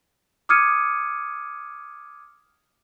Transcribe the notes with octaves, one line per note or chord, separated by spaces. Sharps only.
D6 D#6 F6 G#6 C#7 D#7